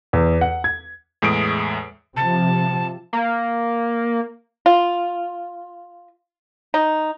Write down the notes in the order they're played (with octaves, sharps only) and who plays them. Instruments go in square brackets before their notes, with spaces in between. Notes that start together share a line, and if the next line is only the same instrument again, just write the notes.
[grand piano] E2
F#5
G#6
[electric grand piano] E2 A2 G#3 D#6 D7
[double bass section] C3 F3 [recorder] A5
[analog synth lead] A#3
[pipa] F4
D#4